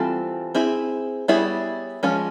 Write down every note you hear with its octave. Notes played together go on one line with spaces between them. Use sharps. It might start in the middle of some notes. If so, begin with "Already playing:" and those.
Already playing: E3 G3 C4 F4 A4
C4 E4 G#4
G3 B3 E4 G#4 C#5
F3 G#3 C#4